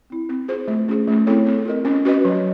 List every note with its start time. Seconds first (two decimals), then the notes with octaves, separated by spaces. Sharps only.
0.10 C4 E4
0.29 C4
0.48 F4 G#4 C5
0.68 A3
0.88 C#4 F4 G#4
1.07 A3
1.26 C4 E4 A4 C#5
1.46 C4
1.65 F4 A#4 D#5
1.85 C#4
2.05 F#4 B4 D#5
2.25 F#3